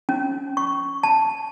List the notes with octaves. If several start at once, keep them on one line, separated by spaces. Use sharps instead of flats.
C#4
C#6
A5